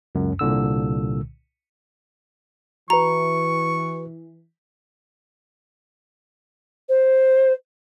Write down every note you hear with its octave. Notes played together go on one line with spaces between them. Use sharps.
C#2 F#2
C2 A#2 D3 E6
E3 F#4 B4 A#5 C#6
C5